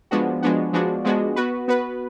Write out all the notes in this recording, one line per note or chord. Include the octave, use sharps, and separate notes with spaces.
F3 G#3 B3 D4 F#4
F3 G#3 B3 D4 F#4
F3 G#3 B3 D4 F#4
F3 G#3 B3 D4 F#4
B3 F#4 B4
B3 F#4 B4